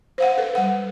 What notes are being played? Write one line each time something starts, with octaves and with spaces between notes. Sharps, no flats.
C5 F5 F#5
A4 B4
G3 F#5